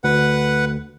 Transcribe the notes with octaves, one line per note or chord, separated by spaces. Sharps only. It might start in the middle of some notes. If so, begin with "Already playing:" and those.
D2 B4 F#5